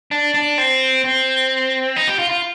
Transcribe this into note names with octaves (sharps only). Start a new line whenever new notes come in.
D4
D4
C4
C4
D#4
G4
F4
F4